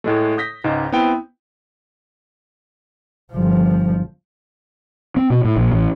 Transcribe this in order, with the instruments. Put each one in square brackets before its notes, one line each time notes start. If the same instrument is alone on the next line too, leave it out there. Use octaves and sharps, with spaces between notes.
[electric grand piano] A2 G#3 A3
D#6 G6 A#6 B6
C#2 G#2 D#4
B3 C4 E4 G5
[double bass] G1 F3
[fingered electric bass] C4
B2
A2
A#1
A1